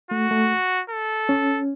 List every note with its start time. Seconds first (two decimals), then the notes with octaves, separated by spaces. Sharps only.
0.11 A3 F#4
0.31 A3
0.90 A4
1.29 C#4